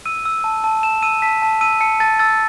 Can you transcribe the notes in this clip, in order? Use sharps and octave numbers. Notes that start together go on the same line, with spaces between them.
E6 D#7
E6
A5
A5
A5 E7
E6 D#7
A5 B6
A5
E6 D#7
A5 C#7
A5 A6
E6 A6